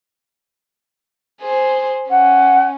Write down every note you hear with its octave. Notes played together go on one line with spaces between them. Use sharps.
G#4 C5
C#4 F#5